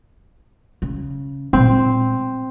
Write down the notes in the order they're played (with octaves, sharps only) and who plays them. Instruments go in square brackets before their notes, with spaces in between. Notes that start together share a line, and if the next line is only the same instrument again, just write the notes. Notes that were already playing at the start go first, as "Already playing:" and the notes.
[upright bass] C#3
[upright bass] A#2 G#3 [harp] C4